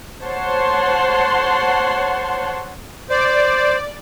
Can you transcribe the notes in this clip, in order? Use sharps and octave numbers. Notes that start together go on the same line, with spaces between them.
C5 C#5 F#5 A5 C6
C5 D5